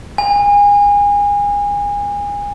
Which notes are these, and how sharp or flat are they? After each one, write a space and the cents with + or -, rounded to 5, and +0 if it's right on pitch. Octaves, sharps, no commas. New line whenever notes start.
G#5 -30